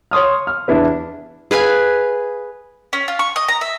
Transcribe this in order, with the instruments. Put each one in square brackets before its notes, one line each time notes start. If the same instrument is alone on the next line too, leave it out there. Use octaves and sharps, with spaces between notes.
[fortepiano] C#5 C6 D#6 F6
F6
E2 D4 E4 B4
[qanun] G#4 B4 F5 G#5
[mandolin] C#4
F4
C#6
D#5
A#5
E5